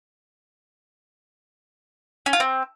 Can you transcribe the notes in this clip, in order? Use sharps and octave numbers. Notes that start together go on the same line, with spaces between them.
C#4
F4
C4